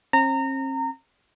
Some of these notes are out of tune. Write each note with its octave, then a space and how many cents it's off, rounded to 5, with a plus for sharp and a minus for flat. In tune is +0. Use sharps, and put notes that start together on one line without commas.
C4 +45 A#5 -25